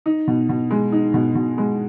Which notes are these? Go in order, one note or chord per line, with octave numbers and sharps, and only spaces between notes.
D#4
B2
B2
G#3
D#4
B2
B2
G#3